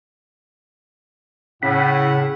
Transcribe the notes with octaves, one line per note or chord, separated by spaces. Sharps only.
A2 C#3 F#5 B6